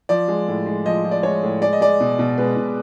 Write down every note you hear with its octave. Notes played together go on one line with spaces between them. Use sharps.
F3 D5
G#3
A2
G#3
F3 D#5
F3
D5
G#3 C#5
A2
G#3 D5
D#5
G#3 D5
B2
B2
G#3 B4
B2